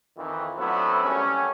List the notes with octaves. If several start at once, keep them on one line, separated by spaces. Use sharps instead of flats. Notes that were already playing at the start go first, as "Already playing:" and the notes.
F2 D#3 E3
F#3 A3 B3 C4 D4 E4
F#2 G3 A3 C#4